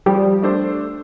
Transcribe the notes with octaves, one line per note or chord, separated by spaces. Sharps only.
F3 G3
A3 D4 A4 C5